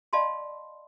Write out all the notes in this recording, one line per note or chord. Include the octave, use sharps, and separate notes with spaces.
D5 D#5 F5 A5 B5 C6